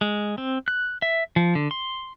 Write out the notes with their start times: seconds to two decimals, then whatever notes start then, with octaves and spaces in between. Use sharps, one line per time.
0.01 G#3
0.38 C4
0.68 F#6
1.02 E5
1.36 F3
1.55 D3
1.71 C6